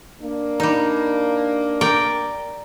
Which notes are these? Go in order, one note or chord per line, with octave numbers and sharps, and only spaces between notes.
A#3 D4
G3 D#4
A#4 D5 G5